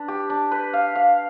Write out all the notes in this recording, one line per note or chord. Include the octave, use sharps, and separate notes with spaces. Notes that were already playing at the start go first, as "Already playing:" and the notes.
Already playing: D4 B4
G4
D4
B4
F5
F5